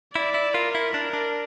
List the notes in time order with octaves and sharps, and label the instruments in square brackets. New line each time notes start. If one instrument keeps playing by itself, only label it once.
[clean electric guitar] E4 [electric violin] D5
[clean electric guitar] E4
[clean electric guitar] F4 [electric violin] A#4
[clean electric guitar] E4
[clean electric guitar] D4 [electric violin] A#4
[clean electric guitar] D4